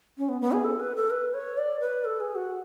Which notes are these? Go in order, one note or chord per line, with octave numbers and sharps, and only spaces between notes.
C#4
B3
B3
G#4
A4
B4
A4
B4
C#5
D5
B4
A4
G#4
F#4